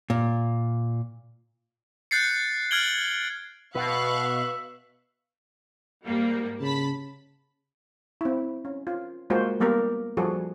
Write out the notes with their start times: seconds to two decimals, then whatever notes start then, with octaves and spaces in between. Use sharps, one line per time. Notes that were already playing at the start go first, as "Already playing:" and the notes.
0.10 A#2
2.11 F#6 G6 A6 C7 C#7
2.71 F6 F#6 G#6 D7 F#7 G7
3.75 B2 B4 E5 F5 C#6 F#6
6.04 G#2 G3 A#3
6.61 C#3 A5 B5 B6
8.21 C4 E4
8.65 C#4
8.87 F4
9.30 G#3 A#3 F4 F#4 C5
9.60 G3 A#3 B3 G4 A#4
10.17 F3 G3 F#4 G#4 A4